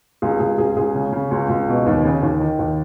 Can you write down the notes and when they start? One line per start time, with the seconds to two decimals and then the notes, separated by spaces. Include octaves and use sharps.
0.22 C#2 G#4
0.40 C#2 G#4
0.58 C#2 G#4
0.76 C#2 G#4
0.95 C#3
1.12 C#3
1.31 C#2
1.49 C#2
1.68 B2
1.86 D#2
2.05 C#3
2.22 D#2
2.40 D#3
2.59 D#2